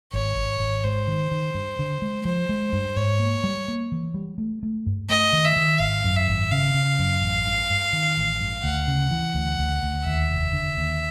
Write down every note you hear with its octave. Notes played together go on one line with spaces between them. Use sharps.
G#1 C#5
G#1
G#1
G#2 C5
D#3
D#3
G2
D3
G#3
F3 C5
G#3
G2
G#2 C#5
A#3
G3
A#3
E3
G3
A3
A3
G2
A3 D#5
D#3
E5
D#3
G#1 F5
F#2
E5
G#1
C#3 F5
C#3
F#2
A1
G2
G2
D#3
A1
G2
D2 F#5
C#3
E3
D2
D2
D2
D#2 E5
F1
D3
D#2